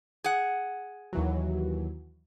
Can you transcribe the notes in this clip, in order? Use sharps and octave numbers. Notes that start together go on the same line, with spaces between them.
G#4 F#5
D#2 E3 F#3